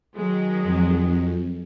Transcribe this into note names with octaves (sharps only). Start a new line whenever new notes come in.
D#3 F#3 G#3
F2